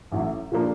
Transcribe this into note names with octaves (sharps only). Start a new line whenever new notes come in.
A1 A2 F#3
A#2 F3 A#3 D4